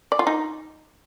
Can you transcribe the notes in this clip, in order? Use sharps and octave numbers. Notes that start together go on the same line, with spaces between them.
D5
F4
D#4